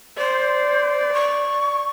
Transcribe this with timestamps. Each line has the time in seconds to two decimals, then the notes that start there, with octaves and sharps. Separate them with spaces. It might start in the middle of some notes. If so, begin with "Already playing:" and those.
0.17 C5 D5
1.13 C#6